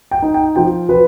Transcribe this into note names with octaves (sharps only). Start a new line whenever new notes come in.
G5
D#4
G5
F3 G5
F3 B4